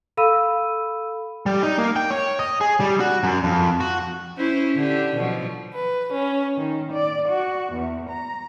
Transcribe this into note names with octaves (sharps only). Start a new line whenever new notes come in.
A4 F5 B5 E6 D#7
G3
D#4
A#3
G5
C#5
D#5
G#4
G3
F#4
F#2
F2
F#4
C#4 E4 C5
D3 G4
B2 F3 F#3
B4
C#4
D#3
D5
F#4
E2
A#5